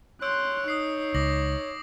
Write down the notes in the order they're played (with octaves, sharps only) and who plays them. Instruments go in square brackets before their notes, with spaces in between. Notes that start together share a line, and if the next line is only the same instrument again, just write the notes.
[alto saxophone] C#5 [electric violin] C6 F#6 [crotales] E6 G6 D7
[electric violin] D#4 [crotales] D#6 C7
[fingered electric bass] C#2 [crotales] D6 A#6 F#7